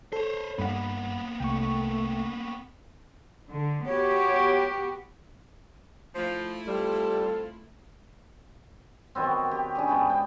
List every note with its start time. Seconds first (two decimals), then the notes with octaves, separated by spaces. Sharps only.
0.13 A4 C5 C#5
0.58 G2 A#3 B3 F#5 B5
1.40 C2 A3 G5 C#6
3.49 D3
3.86 B3 F#4 G4 C#5
6.15 F3 A3 E4
6.67 G3 C4 F4 A4
9.15 D#3 F#3 B3 C4
9.51 G4
9.75 C#3 D4 G#4
9.88 G#2 B3 G#4 G5
10.10 G5